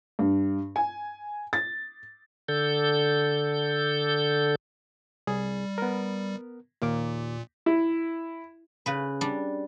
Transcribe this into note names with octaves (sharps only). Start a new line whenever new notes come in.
G2
G#5
A6
D3 A4 G6
C2 G3 G#4
B3 A#4
D#2 A#2 A#3 D6
E4
C#3 B4
G3 D4